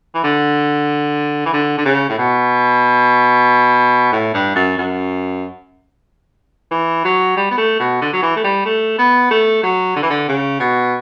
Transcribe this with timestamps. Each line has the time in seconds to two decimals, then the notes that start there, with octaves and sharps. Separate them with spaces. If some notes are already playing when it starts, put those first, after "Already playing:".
0.14 E3
0.24 D3
1.46 E3
1.53 D3
1.78 D3
1.85 C#3
2.09 A2
2.18 B2
4.12 A2
4.34 G2
4.55 F#2
4.78 F#2
6.71 E3
7.04 F#3
7.37 G3
7.51 B3
7.58 A3
7.79 B2
8.01 D3
8.13 F#3
8.22 E3
8.36 A3
8.44 G3
8.65 A3
8.98 B3
9.31 A3
9.63 F#3
9.96 D3
10.03 E3
10.10 D3
10.28 C#3
10.60 B2